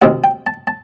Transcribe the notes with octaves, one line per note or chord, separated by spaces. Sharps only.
D2 C3 D#3 F#5
G5
A5
A5